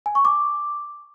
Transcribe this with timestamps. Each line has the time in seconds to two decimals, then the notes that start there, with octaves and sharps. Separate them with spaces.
0.06 G#5
0.15 C#6
0.25 D6